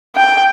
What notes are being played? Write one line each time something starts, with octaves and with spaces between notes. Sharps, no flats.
G5